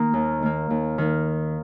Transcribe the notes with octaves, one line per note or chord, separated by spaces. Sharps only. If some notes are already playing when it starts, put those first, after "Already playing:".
Already playing: D#3 A#3 A#4 D#5
D#2
D#3 A#3
D#2
D#3 A#3